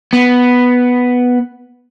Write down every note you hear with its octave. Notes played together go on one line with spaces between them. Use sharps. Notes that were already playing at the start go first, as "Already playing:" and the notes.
B3